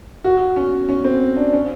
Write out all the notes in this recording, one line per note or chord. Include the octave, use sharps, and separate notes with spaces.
F#4
C#4
C#4
C4
D4
C#4